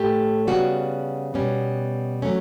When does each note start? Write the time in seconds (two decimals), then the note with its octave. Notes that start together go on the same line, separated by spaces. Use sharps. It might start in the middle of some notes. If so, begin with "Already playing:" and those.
Already playing: A2 A3 G4
0.47 C#3 G3 B3 F#4
1.34 B2 G3 B3 C#4
2.22 F#3 A3 C#4